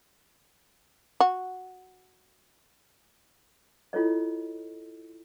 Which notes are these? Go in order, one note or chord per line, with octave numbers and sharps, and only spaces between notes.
F#4
E4 F4 A4 C#5 D#5